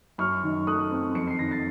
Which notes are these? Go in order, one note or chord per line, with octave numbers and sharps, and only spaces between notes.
F#2 C#6 F6
D#3
A3 D#6 F#6
C4
F2 C#7
C7
D#3 A#6
A6 C7